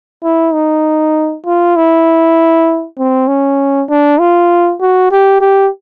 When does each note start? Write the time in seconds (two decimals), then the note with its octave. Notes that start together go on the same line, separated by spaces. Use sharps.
0.24 E4
0.53 D#4
1.46 F4
1.76 E4
2.98 C4
3.28 C#4
3.89 D4
4.19 F4
4.81 F#4
5.11 G4
5.41 G4